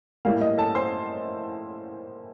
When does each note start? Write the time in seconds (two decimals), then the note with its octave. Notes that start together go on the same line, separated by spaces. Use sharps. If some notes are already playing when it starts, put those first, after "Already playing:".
0.25 A2 G3 A#3 F5
0.41 D#5
0.58 A4 A5
0.75 C5 C6